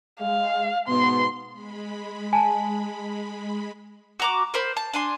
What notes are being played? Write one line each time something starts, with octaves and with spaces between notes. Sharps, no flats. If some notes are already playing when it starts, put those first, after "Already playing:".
G#3 F5
G#2 B2 B3 C6
G#3 B5
G#5 A5
F#4 A#5 D6
A#4 C5 B5
A5
D4 G#5 C6